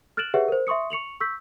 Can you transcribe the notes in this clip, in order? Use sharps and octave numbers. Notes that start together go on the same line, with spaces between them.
F6 F#6 A6 D7 E7 F#7
G4 G#4 B4 C#5 E5 F#5
A#4 C5
E5 C6 C#6 D#6 C#7
C#6 C#7 F7 F#7
C#6 E6 G6 B6